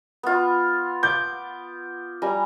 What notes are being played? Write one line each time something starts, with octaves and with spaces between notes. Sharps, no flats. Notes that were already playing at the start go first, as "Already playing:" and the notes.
B3 F4
D6 G6
G3 G#5 A#5